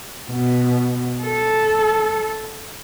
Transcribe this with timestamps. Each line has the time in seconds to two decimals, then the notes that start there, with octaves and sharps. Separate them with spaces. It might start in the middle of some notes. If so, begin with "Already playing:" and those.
0.30 B2
1.21 A4